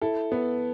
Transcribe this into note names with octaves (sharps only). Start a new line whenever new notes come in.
E4 A4
B3